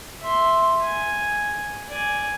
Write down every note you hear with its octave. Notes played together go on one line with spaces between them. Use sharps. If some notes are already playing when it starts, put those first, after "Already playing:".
E5 C6
G#5
D5 G#5